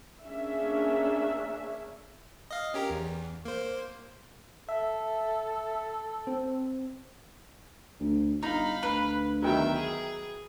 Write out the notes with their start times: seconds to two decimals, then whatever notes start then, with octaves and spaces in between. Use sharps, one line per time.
0.24 A#3 C#4 D4 G#4 E5
2.51 D#5 F5
2.74 C#4 G4 A#4
2.90 E2
3.45 A#3 C5
4.69 A4 E5
6.27 C4
8.00 D2
8.43 G1 D#4 F5 B5
8.83 D2 B4
9.42 B2 D#3 F#3 E5 G5
9.75 G#4